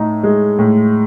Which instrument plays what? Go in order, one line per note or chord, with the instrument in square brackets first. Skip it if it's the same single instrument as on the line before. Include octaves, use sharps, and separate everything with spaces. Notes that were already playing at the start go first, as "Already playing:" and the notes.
Already playing: [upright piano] A2 D#4
G#3
A2